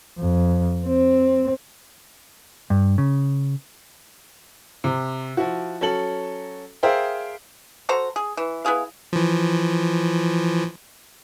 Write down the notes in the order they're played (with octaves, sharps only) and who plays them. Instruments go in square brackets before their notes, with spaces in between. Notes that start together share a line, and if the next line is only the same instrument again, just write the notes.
[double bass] F2
C4
[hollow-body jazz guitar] G2
C#3
[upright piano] C3
F3 E4 F#4
F#3 C#4 A4 F#7
G#4 A#4 C5 E5 F5 G5
[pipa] F#4 A4 C5 A#5
G#4
E3
B3 E4 G#4 F5
[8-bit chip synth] E3 F3